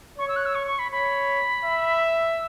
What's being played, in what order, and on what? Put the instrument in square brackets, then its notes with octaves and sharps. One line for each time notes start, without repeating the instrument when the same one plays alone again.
[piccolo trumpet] C#5 [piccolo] C#6
[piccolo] E6
F#6
E6
C#6
C#6
B5
[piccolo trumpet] C#5 [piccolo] B5
[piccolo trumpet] E5
[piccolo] E6